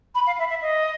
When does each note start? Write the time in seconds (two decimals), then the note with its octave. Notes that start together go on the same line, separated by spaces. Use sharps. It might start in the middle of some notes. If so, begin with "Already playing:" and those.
0.15 B5
0.27 F5
0.39 E5
0.50 E5
0.62 D#5